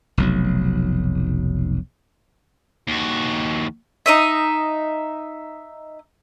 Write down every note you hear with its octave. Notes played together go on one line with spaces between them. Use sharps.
F1 B1 F#3
D#2 F#4
D#4 D#5 E5